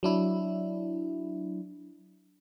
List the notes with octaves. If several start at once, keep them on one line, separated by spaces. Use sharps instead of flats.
F#3 D4 E4